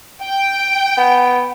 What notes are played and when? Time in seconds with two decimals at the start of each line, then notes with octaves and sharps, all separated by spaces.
0.22 G5
0.97 B3